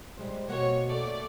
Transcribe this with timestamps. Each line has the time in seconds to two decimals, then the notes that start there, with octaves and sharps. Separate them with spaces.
0.18 G3 G#3 C5
0.49 B2 A#3 C4 C#5 F#5
0.87 A3 D5